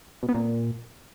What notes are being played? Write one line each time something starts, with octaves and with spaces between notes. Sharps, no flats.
B2
B3
A#2